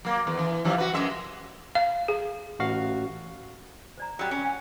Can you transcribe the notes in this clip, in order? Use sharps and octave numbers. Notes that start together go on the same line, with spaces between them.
F#3 A#3
E2
E3
E3 F3 G3
F#4 B4
F#2 G#3 E5
F5
G#4
A1 F#4 F5
C5 D5 A#5
F#3 G3
C#4
F#5 G#5